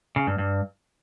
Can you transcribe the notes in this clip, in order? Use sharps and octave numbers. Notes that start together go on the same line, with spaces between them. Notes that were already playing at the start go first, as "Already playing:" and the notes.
C#3
G2
G2